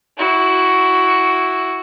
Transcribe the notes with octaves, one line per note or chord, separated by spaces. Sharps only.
E4 F#4